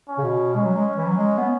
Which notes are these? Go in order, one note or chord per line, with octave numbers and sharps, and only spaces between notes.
C#4
C#3
B2
G#3 C#4
F#3
G#3
E3
F#3
G#3
B3